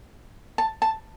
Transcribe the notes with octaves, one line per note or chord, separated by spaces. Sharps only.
A5
A5